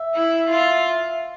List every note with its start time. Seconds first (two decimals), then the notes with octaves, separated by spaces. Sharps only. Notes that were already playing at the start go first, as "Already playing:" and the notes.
Already playing: E5
0.15 E4
0.50 F4